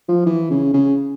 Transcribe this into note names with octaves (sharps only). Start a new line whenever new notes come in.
F3
E3
C#3
C#3